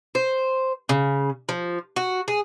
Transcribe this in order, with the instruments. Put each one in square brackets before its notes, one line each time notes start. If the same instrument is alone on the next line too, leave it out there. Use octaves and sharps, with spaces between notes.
[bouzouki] C5
C#3
F3
F#4
G#4